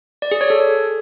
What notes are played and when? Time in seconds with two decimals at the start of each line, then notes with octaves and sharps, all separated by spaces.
0.22 D5
0.32 G#4
0.41 C#5
0.50 A4